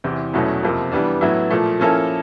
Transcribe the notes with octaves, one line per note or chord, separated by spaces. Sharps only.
E2 C3 E3
E2 B2 F#3 A3 C#4
F2 C3 F3 A#3
E3 G3 B3 D4
A2 F#3 B3 E4
A#2 F3 A3
F3 A#3 C#4 E4 A4